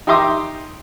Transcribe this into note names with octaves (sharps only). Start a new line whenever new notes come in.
D#4 G4 E5 C6 D6 D#6